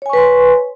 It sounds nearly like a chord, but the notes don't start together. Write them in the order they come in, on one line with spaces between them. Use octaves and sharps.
C#5 G#5 C#6 B4 C6